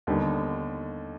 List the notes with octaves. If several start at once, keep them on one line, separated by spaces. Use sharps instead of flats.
D#2 D3 G3 B3 D#4